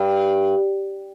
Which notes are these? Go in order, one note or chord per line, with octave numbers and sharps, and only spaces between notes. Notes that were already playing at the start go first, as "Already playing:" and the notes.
Already playing: G2